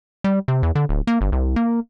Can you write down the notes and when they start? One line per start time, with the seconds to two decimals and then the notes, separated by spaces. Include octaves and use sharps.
0.24 G3
0.48 C3
0.63 E2
0.75 D3
0.89 D1
1.07 A#3
1.21 G1
1.32 C2
1.56 A#3